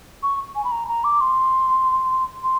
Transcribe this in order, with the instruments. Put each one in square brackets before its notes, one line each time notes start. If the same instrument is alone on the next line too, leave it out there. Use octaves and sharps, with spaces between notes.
[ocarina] C#6
G#5
B5
A#5
A#5
D6
C6
C6